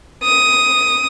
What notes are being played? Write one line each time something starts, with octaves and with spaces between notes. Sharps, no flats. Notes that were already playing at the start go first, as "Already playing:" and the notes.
D#6